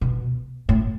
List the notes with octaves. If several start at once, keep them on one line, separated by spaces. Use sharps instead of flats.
B2
A2